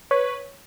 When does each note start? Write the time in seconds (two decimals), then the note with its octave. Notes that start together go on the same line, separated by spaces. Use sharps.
0.11 B4 C#5